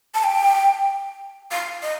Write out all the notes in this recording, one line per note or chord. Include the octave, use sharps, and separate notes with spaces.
A5
G5
F5
D#5